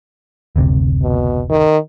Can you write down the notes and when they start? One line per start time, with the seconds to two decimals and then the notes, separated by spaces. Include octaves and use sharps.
0.56 F#1 D2 C3
1.02 B2
1.50 D#3